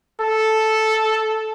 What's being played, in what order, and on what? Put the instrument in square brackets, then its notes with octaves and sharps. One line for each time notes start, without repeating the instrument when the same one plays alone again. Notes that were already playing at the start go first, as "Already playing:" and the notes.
[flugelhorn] A4